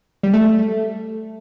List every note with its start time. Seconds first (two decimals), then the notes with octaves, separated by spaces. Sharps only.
0.23 G3
0.33 A3